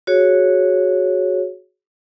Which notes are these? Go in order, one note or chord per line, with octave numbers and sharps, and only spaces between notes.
F#4 G#4 C#5